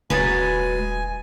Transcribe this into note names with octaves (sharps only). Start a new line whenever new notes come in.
D#1 C#2 F#3 G#3 B4 G#5 A6